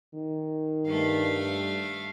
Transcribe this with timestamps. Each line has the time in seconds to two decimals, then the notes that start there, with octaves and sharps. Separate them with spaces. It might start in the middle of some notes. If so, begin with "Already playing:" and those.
0.15 D#3
0.87 G2 A3 F5